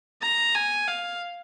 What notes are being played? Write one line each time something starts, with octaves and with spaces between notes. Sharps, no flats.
A#5
G#5
F5